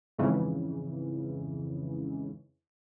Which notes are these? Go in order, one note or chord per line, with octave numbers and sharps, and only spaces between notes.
F2 G#2 C#3 E3